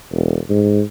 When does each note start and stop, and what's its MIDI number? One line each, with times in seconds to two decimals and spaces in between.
0.12 0.39 28
0.50 0.81 44